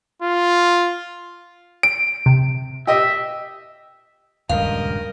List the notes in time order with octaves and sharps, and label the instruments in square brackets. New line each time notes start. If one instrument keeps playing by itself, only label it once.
[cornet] F4
[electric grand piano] D7
[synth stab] C3
[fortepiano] G4 D#5 [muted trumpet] E5
[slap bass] D#1 C#2 [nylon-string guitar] G2 [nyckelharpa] A#4 D#5 [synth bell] F5